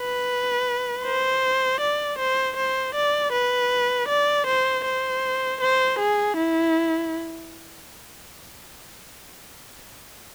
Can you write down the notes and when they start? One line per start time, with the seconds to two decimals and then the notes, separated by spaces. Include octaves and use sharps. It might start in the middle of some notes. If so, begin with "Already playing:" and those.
Already playing: B4
1.04 C5
1.81 D5
2.19 C5
2.57 C5
2.95 D5
3.33 B4
4.08 D5
4.47 C5
4.85 C5
5.61 C5
5.99 G#4
6.37 E4